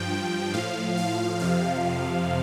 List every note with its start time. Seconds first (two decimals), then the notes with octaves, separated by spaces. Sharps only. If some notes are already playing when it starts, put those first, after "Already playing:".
Already playing: G2 F3 G5
0.54 A2 F3 F5
0.97 F5
1.40 F2 C3 F3 F5